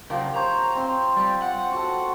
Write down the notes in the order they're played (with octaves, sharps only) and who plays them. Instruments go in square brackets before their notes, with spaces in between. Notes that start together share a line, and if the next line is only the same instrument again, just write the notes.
[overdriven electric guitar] C#3 A#4 [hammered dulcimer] F3 G4
[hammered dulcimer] C5 C#5 [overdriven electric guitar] A#5
[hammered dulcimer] C4 C6
[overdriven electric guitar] G3
F#5
[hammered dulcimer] F#4 A4